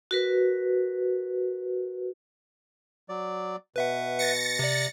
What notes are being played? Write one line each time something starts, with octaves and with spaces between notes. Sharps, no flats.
F#4 A#4 B4
F#3 D5
B2 B4 E5 F#5
A6 A#6 C#7
C3 D5